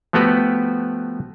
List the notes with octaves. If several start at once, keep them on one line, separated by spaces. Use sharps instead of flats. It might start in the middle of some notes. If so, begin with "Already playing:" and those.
F3 A3 B3 F#4 G4 B4